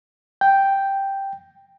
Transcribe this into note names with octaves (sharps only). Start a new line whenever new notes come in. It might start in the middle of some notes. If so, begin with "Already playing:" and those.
G5